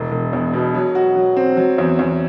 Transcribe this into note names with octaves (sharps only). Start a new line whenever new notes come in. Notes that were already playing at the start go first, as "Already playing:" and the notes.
Already playing: E1
E1
E2
B2
F#3
F#4
F#3
C4
F#3
E2
E2